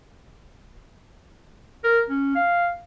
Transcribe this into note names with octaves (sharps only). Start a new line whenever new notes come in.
A#4
C#4
F5